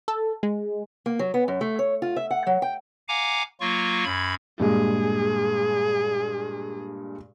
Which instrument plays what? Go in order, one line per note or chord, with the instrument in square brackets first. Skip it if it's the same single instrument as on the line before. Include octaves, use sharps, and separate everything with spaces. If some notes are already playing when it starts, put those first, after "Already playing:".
[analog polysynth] A4
G#3
[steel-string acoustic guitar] A#3
F#3
B3
F#2
A3
C#5
F4
E5
F#5
F#3
G5
[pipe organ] F5 F#5 G#5 A#5 D6
F#3 A#3 F4 C#6
F#2 B5 G#6
[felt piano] G2 A#2 G#3 [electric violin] G#4